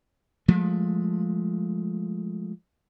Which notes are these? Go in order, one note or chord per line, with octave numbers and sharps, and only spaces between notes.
F3 G#3 A3